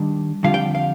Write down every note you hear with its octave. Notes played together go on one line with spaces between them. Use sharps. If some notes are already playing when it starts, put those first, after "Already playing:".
Already playing: D#3 G3 D4
F2 D3 G3 D4 F4 F5
G5
F5